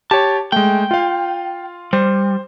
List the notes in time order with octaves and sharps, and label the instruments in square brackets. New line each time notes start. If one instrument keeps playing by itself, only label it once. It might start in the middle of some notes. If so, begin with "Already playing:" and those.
[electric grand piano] G4 C#5 [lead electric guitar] A5
[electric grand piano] G#3 A3 [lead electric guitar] G5
[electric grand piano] F4 F5
[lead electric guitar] G3 [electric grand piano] C5